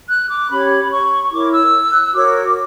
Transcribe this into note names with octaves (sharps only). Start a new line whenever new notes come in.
F#6
D6
C#4 G4 C#5 B5
C#6
E4 A#4 C#5 D6
E6
F#6
E6
F#4 A#4 C#5 D6